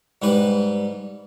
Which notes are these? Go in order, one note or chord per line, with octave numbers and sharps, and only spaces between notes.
G#2 G3 B4